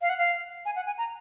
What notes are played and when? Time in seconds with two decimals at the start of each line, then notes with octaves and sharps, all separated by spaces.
0.02 F5
0.09 F#5
0.17 F5
0.65 G#5
0.76 F#5
0.86 G#5
0.98 A#5